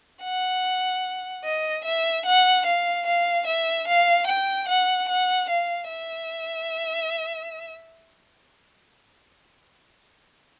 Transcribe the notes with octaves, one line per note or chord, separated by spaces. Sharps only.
F#5
D#5
E5
F#5
F5
F5
E5
F5
G5
F#5
F#5
F5
E5